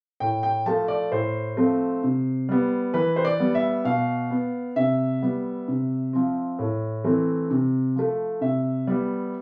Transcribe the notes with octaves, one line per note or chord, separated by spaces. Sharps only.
A2 G5
G5
F3 A3 A5
D5
A2 C5
F3 A3 C4
C3
G3 B3
E3 B4
C5
D5
G3 B3
E5
B2 F5
B3
C3 E5
G3 B3
C3
F3 C4
A2
E3 A3 C4
C3
F3 A3
C3 E5
G3 B3